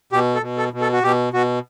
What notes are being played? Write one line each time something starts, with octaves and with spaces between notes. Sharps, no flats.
B2 G4
A4
B2
A4
B2
A4
F#4
B2 G4
B2 F#4